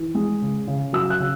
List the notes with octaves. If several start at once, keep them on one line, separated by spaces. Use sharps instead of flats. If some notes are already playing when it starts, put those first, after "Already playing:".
Already playing: E3
G#3
C#3
C#3
F#3 E6
F#6
C#3